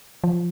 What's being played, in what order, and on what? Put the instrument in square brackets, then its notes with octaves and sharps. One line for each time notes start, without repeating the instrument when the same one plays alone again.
[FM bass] F3